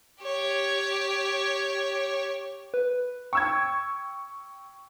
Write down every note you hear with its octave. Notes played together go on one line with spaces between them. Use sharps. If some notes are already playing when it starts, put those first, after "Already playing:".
G4 C#5
B4
G5 C#6 E6 G#6